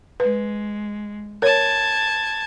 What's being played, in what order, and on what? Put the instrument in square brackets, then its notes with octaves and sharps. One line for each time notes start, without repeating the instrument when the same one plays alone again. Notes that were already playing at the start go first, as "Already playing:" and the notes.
[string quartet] G#3 [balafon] B4
[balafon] A#4 C#5 [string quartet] A5 G#6